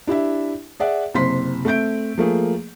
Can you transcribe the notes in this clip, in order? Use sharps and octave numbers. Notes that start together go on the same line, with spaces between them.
D4 E4 G4 E5
G#4 D5 E5 F#5
F#1 C3 C5 C6 B6
A3 C4 E5 G6 D7
F3 A3 A#3 G#4